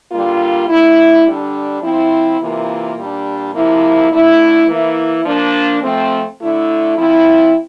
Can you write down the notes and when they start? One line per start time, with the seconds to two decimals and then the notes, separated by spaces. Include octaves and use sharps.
0.12 D3 G3 A#3 F4
0.69 D3 A3 E4
1.26 D3 G3 D4
1.82 F3 C4 E4
2.40 C3 E3 A#3 F4
2.97 A#2 G3 D4
3.54 C3 F3 A#3 E4
4.11 D3 A3 E4
4.68 E3 A#3 E4
5.25 F3 A#3 D4
5.82 F3 A3 C4
6.40 D3 A3 E4
6.97 F3 C4 E4